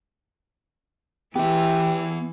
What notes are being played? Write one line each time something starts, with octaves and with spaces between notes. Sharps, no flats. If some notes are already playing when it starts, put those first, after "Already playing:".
E3 B3 G4 E5